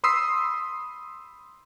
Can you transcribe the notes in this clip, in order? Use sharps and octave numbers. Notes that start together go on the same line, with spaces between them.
B5 C6 D#6 E6 B6 C7